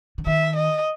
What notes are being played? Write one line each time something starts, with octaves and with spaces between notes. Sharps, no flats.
D3
D#3 E5
D#5